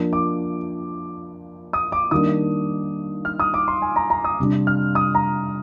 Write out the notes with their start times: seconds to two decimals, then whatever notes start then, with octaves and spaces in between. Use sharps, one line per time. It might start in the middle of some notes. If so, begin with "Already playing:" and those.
Already playing: F3 A#3 D4
0.13 D6
1.73 D#6
1.92 D6
2.11 D#3 G3 A#3 D4 D#6
3.25 F6
3.40 D#6
3.54 D6
3.68 C6
3.82 G#5
3.96 A#5
4.10 A#5
4.24 D#6
4.39 C3 G3 D4
4.67 F6
4.95 D#6
5.15 A#5